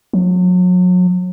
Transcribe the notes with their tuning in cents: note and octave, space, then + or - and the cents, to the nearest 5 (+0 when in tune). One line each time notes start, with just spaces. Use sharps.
F#3 -35